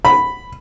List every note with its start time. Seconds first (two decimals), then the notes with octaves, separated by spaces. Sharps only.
0.05 B5